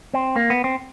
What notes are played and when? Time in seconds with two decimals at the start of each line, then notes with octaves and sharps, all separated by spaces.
0.14 C4
0.36 A#3
0.50 B3
0.64 C4